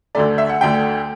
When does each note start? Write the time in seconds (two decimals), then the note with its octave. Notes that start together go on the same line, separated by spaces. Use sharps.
0.15 D2 D3 A3 D5
0.38 E5
0.49 F#5
0.61 D2 D3 A3 G5